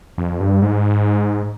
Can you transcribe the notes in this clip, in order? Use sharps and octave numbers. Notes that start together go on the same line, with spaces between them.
F2
G2
G#2